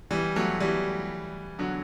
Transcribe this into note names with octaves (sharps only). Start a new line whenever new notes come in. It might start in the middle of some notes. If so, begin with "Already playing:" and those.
E3 G3
F#3 A3
E3 G3
D3 F#3